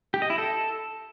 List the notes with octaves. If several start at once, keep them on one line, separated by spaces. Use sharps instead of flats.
G4
D#5
E4
A4